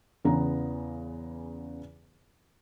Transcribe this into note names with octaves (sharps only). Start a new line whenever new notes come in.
E2 C#3 B3 A#5